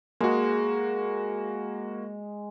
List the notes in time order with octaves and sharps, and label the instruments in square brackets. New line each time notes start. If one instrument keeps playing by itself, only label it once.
[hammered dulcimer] G#3 [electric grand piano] A#3 F#4